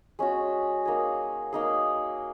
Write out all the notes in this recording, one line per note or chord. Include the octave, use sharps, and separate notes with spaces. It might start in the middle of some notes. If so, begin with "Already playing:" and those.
G#3 C#4 F#4
A#3 D#4 G#4
A#3 D#4 G#4